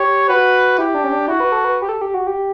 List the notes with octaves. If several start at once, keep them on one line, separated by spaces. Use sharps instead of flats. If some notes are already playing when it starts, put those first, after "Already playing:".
Already playing: G4 C#5
F#4 B4
E4 G4
D4
C#4
D4
E4 F#4
B4
A4
B4
G4
A4
G4
F#4
G4